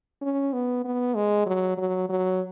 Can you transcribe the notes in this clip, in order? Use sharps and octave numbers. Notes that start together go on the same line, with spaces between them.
C#4
B3
B3
G#3
F#3
F#3
F#3